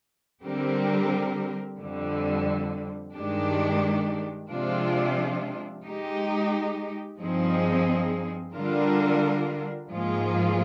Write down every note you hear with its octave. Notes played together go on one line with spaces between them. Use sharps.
D3 G3 C4 G4 A#4
F2 D3 G3
G2 D#3 G#3 D4 G4
C3 F3 G#3 D4 F4
G#3 D#4 G4
G2 F3 C4 D#4 G#4
D3 G3 D4 F4 A#4
G#2 F3 A#3 F4 G#4